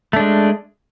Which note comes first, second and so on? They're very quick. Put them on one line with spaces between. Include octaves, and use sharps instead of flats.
A3 D4 G#3